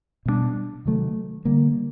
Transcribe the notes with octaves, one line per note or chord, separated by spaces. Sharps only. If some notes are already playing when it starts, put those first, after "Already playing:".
B2 G3 B3 D4
C3 D#3 F#3 A3
D3 G3 A#3